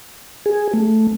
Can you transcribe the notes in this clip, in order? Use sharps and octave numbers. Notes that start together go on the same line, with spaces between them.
G#4
A3